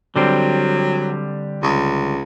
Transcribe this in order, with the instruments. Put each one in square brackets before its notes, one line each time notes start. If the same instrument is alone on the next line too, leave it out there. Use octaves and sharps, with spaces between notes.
[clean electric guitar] D3 G3 C4 [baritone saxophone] F#3
[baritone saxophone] C#2